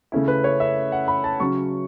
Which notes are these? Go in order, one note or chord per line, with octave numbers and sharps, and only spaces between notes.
C#3 A3 C#4 E4
B4
C#5
E5
F#5
B5
A5
C#3 F#3 C#4 C#6